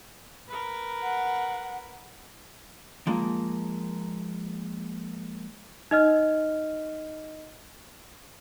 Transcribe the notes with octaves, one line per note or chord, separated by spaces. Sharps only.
A#4 B4
F#5
F3 G#3 A#3
D#4 D#5 F6